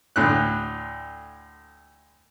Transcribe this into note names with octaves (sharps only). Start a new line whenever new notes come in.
D2 A2 F#6